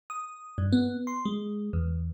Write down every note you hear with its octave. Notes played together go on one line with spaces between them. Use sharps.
D#6
G2
B3
C6
G#3
E2